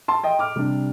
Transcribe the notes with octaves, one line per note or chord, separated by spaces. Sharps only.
A5 C6
D#5 G5
D6 F6
C3 G3 D4